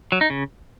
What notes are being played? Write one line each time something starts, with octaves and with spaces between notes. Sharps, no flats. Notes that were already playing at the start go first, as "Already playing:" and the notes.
F#3
D#4
C#3